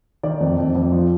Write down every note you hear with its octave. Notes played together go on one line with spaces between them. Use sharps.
D#3 D5
F2
F2
F2
F3